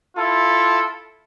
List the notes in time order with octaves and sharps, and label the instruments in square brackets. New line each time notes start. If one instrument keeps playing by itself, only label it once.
[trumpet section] E4 F4 A4